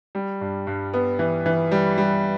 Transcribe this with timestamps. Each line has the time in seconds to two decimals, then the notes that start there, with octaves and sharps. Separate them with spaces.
0.15 G3
0.41 G2
0.67 G2
0.94 B3
1.19 E3
1.46 E3
1.72 G3
1.98 G3